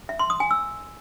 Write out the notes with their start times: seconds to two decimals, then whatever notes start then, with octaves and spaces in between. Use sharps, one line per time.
0.09 E5
0.19 C6
0.30 D#6
0.40 G#5
0.51 E6